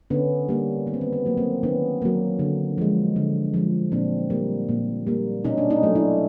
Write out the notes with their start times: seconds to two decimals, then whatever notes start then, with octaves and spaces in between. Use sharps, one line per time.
0.10 D3 B3 C#4
0.49 G3 A#3
0.87 D#3 B3
0.94 C4
1.01 B3
1.13 B3
1.26 F#3 A#3
1.37 A#3 C4
1.63 D#3 B3 C#4
2.02 F#3 A#3
2.39 D3
2.78 F3 G#3
3.16 D3
3.54 F3 G#3
3.92 A#2 C4 D4
4.30 G3 A#3
4.69 A#2
5.07 G3 A#3
5.44 B2 C#4 D#4
5.58 D4
5.70 C#4 D#4
5.83 F#3 A3
5.95 D4 E4